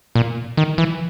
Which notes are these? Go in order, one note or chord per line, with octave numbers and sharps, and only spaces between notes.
A#2
D#3
E3